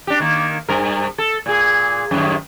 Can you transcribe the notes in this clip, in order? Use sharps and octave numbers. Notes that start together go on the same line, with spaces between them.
D4 G4
D#3 A#3
G2 A#4
A4
A#2 G#4
F#2 A2 D#3